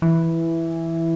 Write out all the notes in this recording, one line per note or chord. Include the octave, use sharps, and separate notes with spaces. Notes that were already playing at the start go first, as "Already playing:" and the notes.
E3